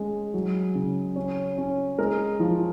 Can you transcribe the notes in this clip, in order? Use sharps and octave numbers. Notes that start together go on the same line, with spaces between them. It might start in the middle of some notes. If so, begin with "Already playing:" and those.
Already playing: G#3 C#4
F#3
C#3
C#4 C#5
C#4
G#3 A#4
F3